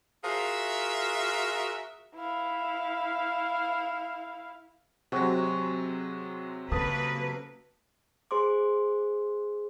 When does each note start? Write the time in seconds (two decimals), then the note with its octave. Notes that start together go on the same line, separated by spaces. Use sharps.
0.25 F4 F#4 G#4 A#4 E5
2.15 E4 F5
5.12 C3 F#3 G#3 C4 F#4
6.72 C#3 A#3 A4 B4 D#6
8.31 G#4 C5 C6 D6